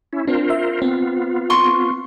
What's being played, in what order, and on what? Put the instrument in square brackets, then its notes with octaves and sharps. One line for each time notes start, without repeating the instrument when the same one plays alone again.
[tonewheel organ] C#4 E4
[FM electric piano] C4 D4 [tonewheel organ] F4 A#4 C5
[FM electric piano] E5
[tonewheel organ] B3 F4 [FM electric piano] C4
[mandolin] C6 C#6